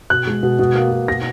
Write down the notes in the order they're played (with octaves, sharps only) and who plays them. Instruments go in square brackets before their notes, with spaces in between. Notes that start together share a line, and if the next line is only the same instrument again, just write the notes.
[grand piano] B2 F#6
G#3
B2
B2
A#3
B2
B2 A#6